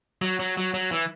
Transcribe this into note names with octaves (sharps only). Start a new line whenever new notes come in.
F#3
F#3
F#3
F#3
E3